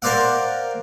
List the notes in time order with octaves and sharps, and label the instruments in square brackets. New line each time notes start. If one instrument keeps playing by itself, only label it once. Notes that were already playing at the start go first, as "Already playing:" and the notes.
[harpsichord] A#4 C5 D5 F5 F#5